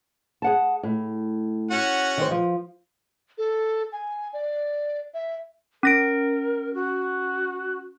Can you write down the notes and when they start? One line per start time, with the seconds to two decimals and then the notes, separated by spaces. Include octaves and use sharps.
0.42 G#4 F#5 A5
0.83 A2
1.71 C#4 F#4 F#5
2.17 D#3 C5
2.31 F3
3.38 A4
3.92 G#5
4.33 D5
5.14 E5
5.83 C#4 A#4 A#6 D7
6.74 F#4